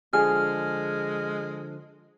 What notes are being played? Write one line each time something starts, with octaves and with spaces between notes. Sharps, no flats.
D3 F3 G#3 G#4 F6